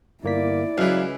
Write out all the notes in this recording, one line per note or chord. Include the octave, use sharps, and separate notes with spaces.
G1 A#3 E4 D5 B6
C#2 E3 F#3 F5